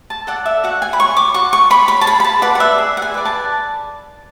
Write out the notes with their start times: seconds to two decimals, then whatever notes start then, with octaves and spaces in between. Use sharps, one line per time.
0.10 A5
0.27 A4 D5 F#5
0.46 E5
0.64 F#4 F#5
0.82 G#5
0.93 B5
0.99 C#5 C#6
1.17 D6
1.34 F#4 C#6
1.53 C#6
1.70 C#5 B5
1.88 B5
2.01 A5
2.06 G#4 B5
2.20 B5
2.24 A5
2.42 B4 D5 F#5
2.55 F#5
2.60 E5
2.78 G#4
2.97 F#5
3.02 G#5
3.14 B4 D5
3.25 A5